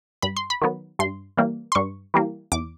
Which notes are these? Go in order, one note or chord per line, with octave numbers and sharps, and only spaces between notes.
G2 B5
C6
B5
D#3 F#3 B3
G2 C6
E3 G3 A#3
C6
G2 C#6
E3 G3 A#3
E2 D6